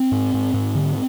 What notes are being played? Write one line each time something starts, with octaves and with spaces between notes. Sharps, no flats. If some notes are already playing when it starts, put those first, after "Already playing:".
Already playing: C4
G#2
G#2
G#2
D3